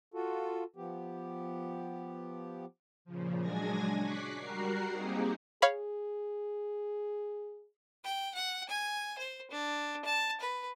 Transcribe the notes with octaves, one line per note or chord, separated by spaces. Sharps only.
F4 F#4 A4
F3 B3 G4
A#2 C#3 F3
F#3 G#3 D4 G#5 G#6 A#6
C#6 D6 F#6 B6 C7
G3 F#4 A#4 F#5 A#5 C7
A#3 C4 D#4 G4 G#4
G#4 C#5 F5 B5
G5
F#5
G#5
C5
D4
A5
B4